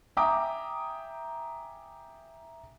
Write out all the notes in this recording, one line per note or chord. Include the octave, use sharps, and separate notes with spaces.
E5 G5 G#5 A#5 D6 D#6